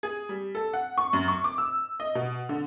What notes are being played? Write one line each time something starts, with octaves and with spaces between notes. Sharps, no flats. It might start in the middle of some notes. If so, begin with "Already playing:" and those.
G#4
G3
A4
F#5
C#6
F#2
C#6
D6
E6
D#5
B2
D3